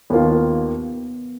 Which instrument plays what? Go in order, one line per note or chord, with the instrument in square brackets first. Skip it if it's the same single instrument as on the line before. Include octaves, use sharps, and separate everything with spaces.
[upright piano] D#2 D#3 A#3 F4 [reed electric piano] B3